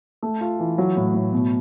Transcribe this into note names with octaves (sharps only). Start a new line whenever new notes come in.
A3
F4
E3
F#3
A2
A2
B2